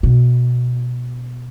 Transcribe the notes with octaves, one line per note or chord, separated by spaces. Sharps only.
B2